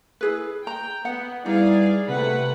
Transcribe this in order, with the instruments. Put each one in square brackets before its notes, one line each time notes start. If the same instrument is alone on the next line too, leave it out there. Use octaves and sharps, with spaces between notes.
[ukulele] E4 G#4 B4
[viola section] G5 [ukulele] A#5
[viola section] B3 [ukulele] F#5
[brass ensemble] G3 B3 E4 [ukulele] D#4 [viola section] G#4 D5 F5
[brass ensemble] C3 [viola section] A3 B4 F#5